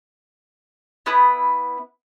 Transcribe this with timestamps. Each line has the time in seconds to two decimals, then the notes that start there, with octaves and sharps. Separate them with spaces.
1.06 B3 E4 B4 D#6